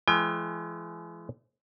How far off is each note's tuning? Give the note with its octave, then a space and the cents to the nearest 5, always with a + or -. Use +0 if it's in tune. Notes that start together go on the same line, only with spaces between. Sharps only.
E3 +45 G#3 +35 G5 +45